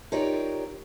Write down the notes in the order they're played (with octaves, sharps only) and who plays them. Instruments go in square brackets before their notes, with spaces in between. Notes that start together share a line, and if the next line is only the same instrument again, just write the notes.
[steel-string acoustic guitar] D#4 F4 G4 A#4 C#5 D5